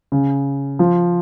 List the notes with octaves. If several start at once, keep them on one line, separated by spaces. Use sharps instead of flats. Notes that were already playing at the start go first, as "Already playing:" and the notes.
C#3
F3